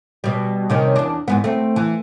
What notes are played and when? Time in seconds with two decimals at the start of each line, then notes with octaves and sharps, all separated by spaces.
0.24 B2 G3
0.70 C3 D#3 C#4
0.96 E2 D4
1.28 E2 G#2 B3
1.44 A3 C4
1.76 E3